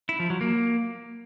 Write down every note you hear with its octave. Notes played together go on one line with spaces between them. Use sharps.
E4
F3
F#3
A#3